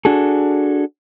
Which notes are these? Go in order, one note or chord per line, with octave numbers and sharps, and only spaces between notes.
D4 F#4 G#4 A4